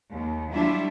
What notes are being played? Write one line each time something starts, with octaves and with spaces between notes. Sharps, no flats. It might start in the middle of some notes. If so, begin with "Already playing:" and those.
D#2
F#3 G3 D4 E4 F4 E5